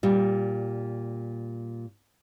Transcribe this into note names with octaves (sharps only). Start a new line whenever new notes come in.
A#2 G3